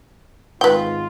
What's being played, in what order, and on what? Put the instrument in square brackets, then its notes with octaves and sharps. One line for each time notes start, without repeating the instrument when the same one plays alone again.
[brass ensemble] G#1 G#2 F4 [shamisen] B4 G5